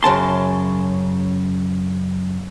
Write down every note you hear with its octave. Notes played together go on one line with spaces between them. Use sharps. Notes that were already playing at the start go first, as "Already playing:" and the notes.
F#2 C#3 A5 C6